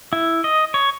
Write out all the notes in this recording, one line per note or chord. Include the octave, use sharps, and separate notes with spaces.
E4
D#5
C#5